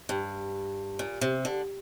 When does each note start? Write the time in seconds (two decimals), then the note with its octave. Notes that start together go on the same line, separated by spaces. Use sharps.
0.09 G2
0.99 A#2
1.21 C3
1.45 D3